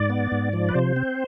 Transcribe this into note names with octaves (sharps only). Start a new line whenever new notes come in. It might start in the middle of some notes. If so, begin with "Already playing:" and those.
Already playing: G#2 D5
B3
G#2
F3
B4
C3 C5
C4